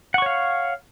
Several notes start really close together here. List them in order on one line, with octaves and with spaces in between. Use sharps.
F#5 C#6 C#5 F5